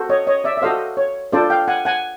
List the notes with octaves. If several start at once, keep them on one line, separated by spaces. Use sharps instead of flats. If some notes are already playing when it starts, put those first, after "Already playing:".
Already playing: F#4 A4 C5
C#5 D#5
C#5 D#5
D5 E5
E5
F#4 A4 C5 D#5 F5
C#5
D4 F4 A4 C5 D5
F5 G5
F#5 G#5
F#5 G#5